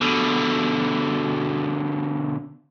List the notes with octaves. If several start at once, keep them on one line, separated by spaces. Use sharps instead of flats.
B2 D3